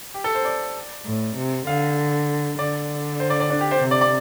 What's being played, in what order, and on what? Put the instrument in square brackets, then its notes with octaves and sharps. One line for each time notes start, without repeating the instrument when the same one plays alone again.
[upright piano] G4
A4
C5
D5
[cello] A2
C3
[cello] D3 [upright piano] F5
[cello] D3 [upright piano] D5
[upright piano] C5
D5
D5
D4
G4
C5
[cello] C3
[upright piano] D5
D5